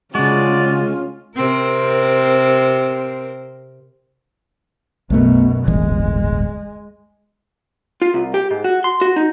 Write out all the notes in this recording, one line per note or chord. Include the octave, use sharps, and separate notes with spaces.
C#3 G#3 C#4 F4 F#4 D5
C3 C4 A#4
B1 F#2 B2 A3 B3
D1 G1 E3 G#3
F4
C2
G4
G#2
F#4
C6
F#4
D#4